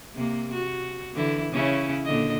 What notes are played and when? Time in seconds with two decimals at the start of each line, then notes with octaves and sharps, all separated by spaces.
0.15 C3 A#3
0.53 F#4
1.14 D3 E3 E4
1.52 C#3 C#4 E4
2.05 A#2 D3 D#5